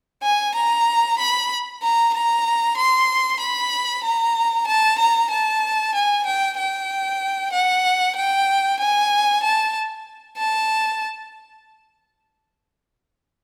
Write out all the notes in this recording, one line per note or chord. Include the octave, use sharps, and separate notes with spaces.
G#5
A#5
B5
A#5
A#5
C6
B5
A#5
A5
A#5
A5
G#5
G5
G5
F#5
G5
G#5
A5
A5